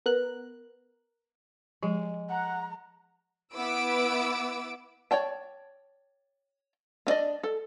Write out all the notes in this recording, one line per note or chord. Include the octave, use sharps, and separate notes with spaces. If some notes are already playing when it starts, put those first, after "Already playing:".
B3 A#4 F#6
F3 G#3
F#5 A#5
B3 E4 B4 D6 E6 D7
C#5 D5 G5 A5
B3 D4 D5 D#5
A4